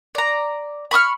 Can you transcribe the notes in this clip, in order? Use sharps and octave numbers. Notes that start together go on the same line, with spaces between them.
D5 A#5
B5 C#6 D#6 F6